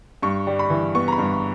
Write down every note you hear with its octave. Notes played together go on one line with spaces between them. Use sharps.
G2 C#6
G3
B5
E3
B3 C#6
A#5
B5
G2